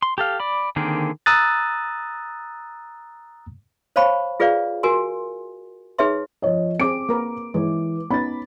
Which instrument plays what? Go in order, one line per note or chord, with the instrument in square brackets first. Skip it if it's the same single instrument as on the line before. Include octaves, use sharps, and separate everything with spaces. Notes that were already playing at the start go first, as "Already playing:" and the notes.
[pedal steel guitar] C6
G4 A4 F5
D5 B5
D3 D#3 A#3 C4 G#4
[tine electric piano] A#5 D#6 E6 F#6 A6
[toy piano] C5 C#5 F5 A5 B5 C#6
F4 G#4 B4 D5 F5
F#4 A#4 G#5 C6
D#4 G#4 B4 C#5 E5 C6
[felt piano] F3 C#5 D#5
[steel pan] C4 G#4 [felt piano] D6 D7
[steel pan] A#3 A#4 B4
[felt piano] E3 [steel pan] G#3 C#5
[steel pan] B3 C#4 D#4 [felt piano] B5 A6